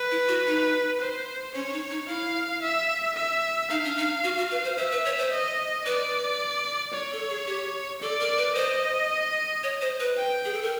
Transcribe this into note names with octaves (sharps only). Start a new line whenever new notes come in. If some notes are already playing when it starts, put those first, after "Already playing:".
Already playing: B4
E4
F#4
D#4
C5
C#4 C#5
D4
D#4
D#4
E4 F5
E5
E5
D#4 F5
D4
D#4
F#4
F#4
B4
C5
C5 E5
B4
C#5
C5
D#5
B4 D5
C#5
A4
G#4
G4
A4 D5
A#4
B4
C5 D#5
C#5
C5
B4
G5
G#4
A4
A#4